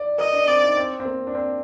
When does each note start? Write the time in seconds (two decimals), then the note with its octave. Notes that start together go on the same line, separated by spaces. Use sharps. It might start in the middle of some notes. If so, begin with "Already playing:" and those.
Already playing: D5
0.18 A#4 D#5
0.33 D4
0.47 C4 D5
0.62 D#4
0.77 C4
1.00 C4
1.05 A#3
1.27 D4
1.35 C4